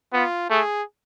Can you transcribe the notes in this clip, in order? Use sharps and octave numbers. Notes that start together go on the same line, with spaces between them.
B3 F4
A3 G#4